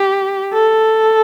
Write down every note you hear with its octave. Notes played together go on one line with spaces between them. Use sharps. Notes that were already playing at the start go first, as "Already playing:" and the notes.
Already playing: G4
A4